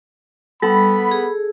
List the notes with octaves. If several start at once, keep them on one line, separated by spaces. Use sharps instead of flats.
G3 B3 A4 F#5 B5
G#4